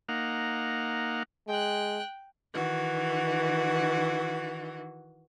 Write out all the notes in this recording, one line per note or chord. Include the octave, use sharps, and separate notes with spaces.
A#3 D#4 F5 F#5
G#3 G5 F#6
D#3 E3 F#4